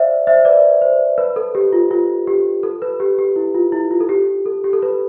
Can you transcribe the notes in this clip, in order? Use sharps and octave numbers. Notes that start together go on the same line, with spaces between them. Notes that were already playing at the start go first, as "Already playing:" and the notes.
Already playing: C5 D5 E5 F5
C5 E5
B4 D5
C5
B4
A4
G4
F4
F4
G4
A4
B4
G4
G4
E4
F4
E4
F4
A4
G4
A4
G4
A4
B4